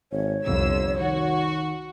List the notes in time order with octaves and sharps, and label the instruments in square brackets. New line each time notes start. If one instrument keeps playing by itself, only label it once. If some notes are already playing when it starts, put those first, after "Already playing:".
[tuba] G#1 [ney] C#5
[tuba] G1 [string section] C2 F2 E6
[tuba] D#3 [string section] F#4